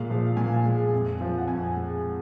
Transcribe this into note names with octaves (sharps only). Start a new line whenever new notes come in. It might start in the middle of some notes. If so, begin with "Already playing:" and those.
Already playing: A#2 G#3 F5
F3
A#2 G#5
G#3
F2
F3
F#5
F2 G#5
G#3